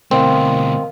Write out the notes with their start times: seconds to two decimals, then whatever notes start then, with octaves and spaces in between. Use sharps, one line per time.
0.11 D2 B2 C4 A#4 D#5 F5